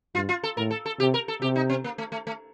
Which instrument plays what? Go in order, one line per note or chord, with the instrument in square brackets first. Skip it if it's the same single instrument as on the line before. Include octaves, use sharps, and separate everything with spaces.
[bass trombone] G2 [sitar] F4
[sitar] F4
A4
[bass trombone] A2 [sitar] A#4
[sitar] A4
A4
[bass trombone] C3 [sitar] G4
[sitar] A#4
A4
[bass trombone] C3 [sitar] G4
[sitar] D#4
C4
A#3
A3
A3
A3